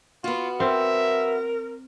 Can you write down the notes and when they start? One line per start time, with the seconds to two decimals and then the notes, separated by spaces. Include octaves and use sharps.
0.24 B3 F4 F#4
0.60 C4 A#4 E5